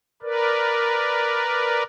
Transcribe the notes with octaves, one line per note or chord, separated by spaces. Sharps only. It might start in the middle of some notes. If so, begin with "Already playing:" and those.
A#4 B4 D5